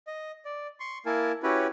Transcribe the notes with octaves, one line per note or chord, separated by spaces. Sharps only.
D#5
D5
C6 C#6
A#3 E4 A#4 G#5 A5
C#4 E4 F#4 G4 B4 C#5